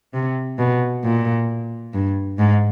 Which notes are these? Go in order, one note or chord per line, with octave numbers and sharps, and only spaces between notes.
C3
B2
A#2
G2
G#2